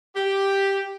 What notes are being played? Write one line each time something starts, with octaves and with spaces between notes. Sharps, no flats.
G4